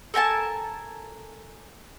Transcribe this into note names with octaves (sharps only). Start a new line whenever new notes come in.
A4 A#4 G#5 A5